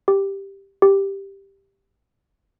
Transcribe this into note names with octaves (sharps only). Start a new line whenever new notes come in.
G4
G4